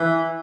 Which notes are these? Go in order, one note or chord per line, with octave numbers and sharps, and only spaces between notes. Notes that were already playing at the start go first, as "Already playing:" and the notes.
Already playing: E3